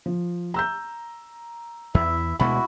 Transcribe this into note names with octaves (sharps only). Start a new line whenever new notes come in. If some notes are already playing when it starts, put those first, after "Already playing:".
F3
A#5 E6 G6
E2 E4 E5
D2 B2 G#3 E4 F#4 B5